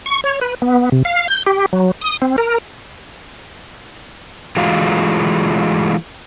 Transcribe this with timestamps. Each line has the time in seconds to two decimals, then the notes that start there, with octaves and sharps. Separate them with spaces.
0.06 C#6
0.24 C#5
0.41 B4
0.62 B3
0.92 C3
1.05 F5
1.28 G6
1.47 G4
1.73 F#3
2.01 D#6
2.22 C4
2.38 A#4
4.57 E3 G#3 A3 F4 F#4